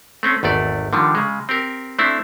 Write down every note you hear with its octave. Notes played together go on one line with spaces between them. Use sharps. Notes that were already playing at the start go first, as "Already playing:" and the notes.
A3 C4 C#4
G#1 E2 A3 D5
D3 D#3 F3 G3
C#3 G#3
C4 G4 A#4
A3 C4 D4 E4